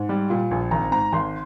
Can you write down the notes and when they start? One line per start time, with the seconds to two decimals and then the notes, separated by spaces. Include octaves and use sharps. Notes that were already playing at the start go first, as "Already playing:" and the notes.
Already playing: G#2
0.09 G3
0.30 A#2
0.51 A#1
0.71 G#1 A#5
0.92 G#2 A#5
1.13 G#1 C6